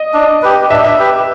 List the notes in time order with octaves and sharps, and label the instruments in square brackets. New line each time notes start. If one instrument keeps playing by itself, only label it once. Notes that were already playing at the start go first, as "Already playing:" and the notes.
Already playing: [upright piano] D#5
[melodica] D4
G4 B4
[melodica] D4 [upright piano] E5
[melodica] G4 B4